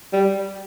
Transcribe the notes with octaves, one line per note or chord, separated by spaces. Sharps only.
G3